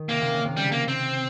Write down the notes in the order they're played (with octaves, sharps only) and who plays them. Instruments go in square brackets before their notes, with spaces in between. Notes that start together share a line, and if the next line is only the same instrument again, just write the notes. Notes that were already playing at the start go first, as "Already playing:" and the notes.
Already playing: [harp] D#3
[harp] C3 [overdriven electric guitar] A#3
[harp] C3
C#3
C3
[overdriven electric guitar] G3
A#3
C4